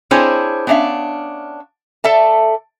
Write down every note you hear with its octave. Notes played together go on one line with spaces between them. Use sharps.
C4 D4 E4 G#4 C5 C#5
B3 C#4 D4 E5 F5
A4 D5 E5 A5